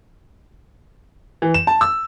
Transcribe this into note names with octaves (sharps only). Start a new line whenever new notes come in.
E3
E7
A5
E6